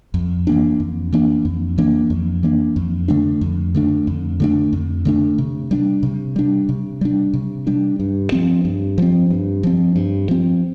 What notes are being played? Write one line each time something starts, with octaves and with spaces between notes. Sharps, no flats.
F2
E3 A#3 D4
F2
E3 A#3 D4
F2
E3 A#3 D4
F2
E3 A#3 D4
F2
D3 A3 D4
F2
D3 A3 D4
F2
D3 A3 D4
F2
D3 A3 D4
C3
G3 D4
C3
G3 D4
C3
G3 D4
C3
G3 D4
G2
F3 C4
G2
F3 C4
G2
F3 C4
G2
F3 C4